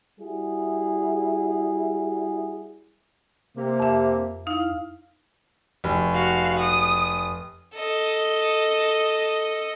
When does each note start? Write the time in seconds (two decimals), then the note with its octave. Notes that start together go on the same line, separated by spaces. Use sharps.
0.20 G3 E4 F#4 G#4
3.57 C3 A#3
3.80 F2 E5
4.47 D#4 E4 F5
5.84 F1
6.14 F#4 F5
6.60 D#6
7.75 A4 D#5